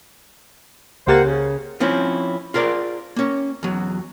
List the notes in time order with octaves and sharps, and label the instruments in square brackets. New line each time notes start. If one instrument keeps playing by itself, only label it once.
[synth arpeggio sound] C#2 G4 A6 [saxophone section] A#3 C5 F#5
[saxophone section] C#3
[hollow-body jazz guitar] F3 C4 C#4 E4
F4 G#4 A#4 C5 D5
A#3 C#4
E2 F#3